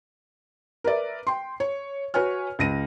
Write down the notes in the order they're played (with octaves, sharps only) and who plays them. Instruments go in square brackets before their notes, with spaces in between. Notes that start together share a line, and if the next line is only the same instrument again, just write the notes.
[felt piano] A#4 B4 D5 E5
G5 C6
C#5
F#4 B4 C#5 G#5 F6
C#2 A#6 D#7